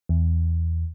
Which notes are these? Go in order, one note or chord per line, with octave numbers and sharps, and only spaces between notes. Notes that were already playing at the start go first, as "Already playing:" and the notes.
E2